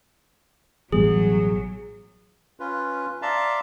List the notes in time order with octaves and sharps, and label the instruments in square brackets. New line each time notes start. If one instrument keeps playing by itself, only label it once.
[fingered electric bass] A1 B2 G3 [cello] F#3 [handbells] G#4
[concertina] C#4 F4 B4
D5 E5 F5 A5 A#5 C6